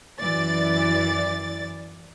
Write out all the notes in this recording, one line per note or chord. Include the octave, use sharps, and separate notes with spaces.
F#2 E3 D5 A6